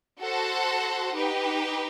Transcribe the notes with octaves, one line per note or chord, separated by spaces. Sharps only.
F#4 A4 C5 F#5
D#4 G4 B4